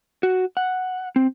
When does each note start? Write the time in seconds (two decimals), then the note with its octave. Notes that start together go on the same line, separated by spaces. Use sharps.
0.23 F#4
0.57 F#5
1.16 C4